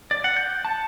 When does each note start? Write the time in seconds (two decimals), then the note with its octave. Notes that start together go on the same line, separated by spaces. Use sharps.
0.11 D5
0.24 F#5
0.37 G6
0.65 A5